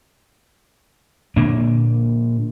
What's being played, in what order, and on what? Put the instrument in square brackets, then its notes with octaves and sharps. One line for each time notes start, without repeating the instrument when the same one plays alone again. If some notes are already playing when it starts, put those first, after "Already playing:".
[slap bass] A#2 D3 A#3 D4